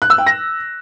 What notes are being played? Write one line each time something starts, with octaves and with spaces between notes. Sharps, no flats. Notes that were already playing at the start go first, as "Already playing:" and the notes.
F#6
E6
G5
A#6